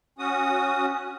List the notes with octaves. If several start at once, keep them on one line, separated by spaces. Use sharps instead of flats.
C#4 F#4 D#6